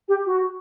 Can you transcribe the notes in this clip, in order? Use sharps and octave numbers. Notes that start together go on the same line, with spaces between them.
G4
F#4